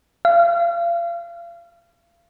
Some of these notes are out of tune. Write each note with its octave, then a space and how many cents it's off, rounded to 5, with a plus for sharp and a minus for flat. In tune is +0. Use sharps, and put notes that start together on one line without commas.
F5 -35